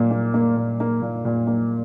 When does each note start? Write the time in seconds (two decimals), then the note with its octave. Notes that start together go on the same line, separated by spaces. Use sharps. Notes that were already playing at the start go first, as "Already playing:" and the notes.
Already playing: A#2 A#3
0.11 A#3
0.34 A#3
0.57 A#2
0.80 A#3
1.02 A#2
1.25 A#2
1.47 A#3